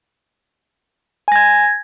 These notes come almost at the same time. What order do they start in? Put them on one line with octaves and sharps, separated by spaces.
G#5 A#6 G#6